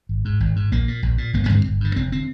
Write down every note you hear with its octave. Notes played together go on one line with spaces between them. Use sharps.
G#1
G#2
G#1
G#2
A#1 A#3
A#2
A#1
A#2
G1 A#3
A#3
G2 D3 C4
G1
G2 D3
F1 C4
D3 C4